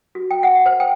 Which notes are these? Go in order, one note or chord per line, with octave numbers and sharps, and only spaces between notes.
F#4
G5
F#5
C5
G5